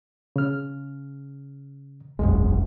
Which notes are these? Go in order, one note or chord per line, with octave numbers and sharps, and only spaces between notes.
C#3 F6
E1 A#1 F#2 G#3